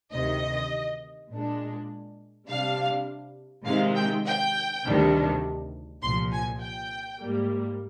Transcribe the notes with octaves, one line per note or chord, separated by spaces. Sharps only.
D2 C3 D#3 D#5
A#2 G#3 D4
C3 G3 D4 F5
C3 D#3 G#3 C4 D#4 F5
G5
G5
D2 C3 D#3 G3 D4
C2 A#2 F3 C6
G#5
G5
G#2 G3 A#3